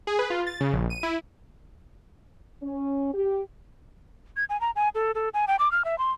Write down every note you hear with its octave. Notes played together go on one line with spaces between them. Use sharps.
G#4
B4
F4
A6
C#3
A#1
D#7
E4
C#4
G4
G#6
G#5
A#5
G#5
A4
A4
G#5
G5
D6
F6
E5
C6